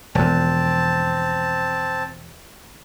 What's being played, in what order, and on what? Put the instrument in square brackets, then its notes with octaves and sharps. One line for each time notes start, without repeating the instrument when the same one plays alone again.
[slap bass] E1 F2 [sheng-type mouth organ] C4 A5